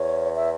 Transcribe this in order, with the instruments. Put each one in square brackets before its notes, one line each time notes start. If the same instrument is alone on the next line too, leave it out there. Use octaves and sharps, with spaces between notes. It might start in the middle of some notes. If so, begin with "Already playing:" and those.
Already playing: [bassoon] E2 [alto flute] C#5
[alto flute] E5